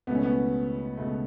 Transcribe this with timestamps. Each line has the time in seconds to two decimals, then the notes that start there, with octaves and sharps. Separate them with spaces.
0.07 C#2 B2 A3 B3
0.15 C#4
0.23 B3
0.97 C#2 B2 A3